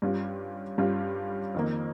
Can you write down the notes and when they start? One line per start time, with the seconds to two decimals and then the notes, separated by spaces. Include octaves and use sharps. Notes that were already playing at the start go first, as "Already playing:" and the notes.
0.02 G2 G3 C#4 F4
0.78 G2 G3 C#4 F4
1.54 F2 D#3 A#3